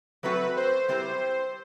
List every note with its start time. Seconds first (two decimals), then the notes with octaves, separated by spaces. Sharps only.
0.23 F#3 A3 C4 F#4 A4 B4
0.56 C5
0.88 G3 C4 E4 G4 B4 C5